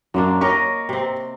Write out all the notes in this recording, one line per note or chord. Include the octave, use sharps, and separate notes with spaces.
F#2 F#3 A#3 D4
G4 A#4 C#5 D#5 A#5 C#6
C3 C4